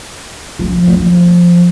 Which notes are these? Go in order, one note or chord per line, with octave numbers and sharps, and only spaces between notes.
F3
F3